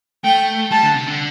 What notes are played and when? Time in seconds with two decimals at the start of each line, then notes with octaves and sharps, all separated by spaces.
0.24 A3 G5
0.71 G3 A5
0.83 D3
0.95 C3
1.07 D3